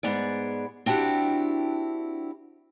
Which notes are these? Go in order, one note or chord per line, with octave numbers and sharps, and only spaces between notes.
G#2 B3 G#4 D5
C4 D4 E4 F#4 G4